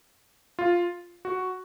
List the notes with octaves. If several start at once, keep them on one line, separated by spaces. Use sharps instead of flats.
F4
F#4